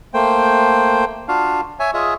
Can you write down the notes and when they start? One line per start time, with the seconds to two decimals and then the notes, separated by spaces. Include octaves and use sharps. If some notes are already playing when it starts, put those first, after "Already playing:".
0.14 A3 A#3 C5 G5
1.28 D4 F4 F#4 F5
1.80 C#5 E5 G#5
1.94 F4 G#4 C#5 D#5 E5